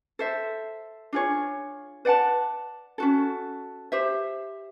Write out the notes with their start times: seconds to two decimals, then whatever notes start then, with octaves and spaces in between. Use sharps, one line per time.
0.19 A4 C5 E5
1.13 D4 F4 G#4 C#5
2.05 B4 D5 F#5 A5
2.98 C#4 F#4 A4
3.92 G4 C5 E5